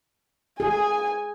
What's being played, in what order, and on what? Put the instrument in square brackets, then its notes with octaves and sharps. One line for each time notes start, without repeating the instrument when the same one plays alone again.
[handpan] G#4 [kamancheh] G#5